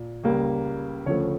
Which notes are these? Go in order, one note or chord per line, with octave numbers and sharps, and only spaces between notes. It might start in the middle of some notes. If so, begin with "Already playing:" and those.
Already playing: A#2
C#2 C#3 G3 A#3
D2 C#3 F3 A3 C#5